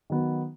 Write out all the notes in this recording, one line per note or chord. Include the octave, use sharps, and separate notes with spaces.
D#3 F#3 B3